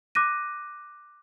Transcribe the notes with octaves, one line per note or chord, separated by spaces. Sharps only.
D6 F#6 A#6 D#7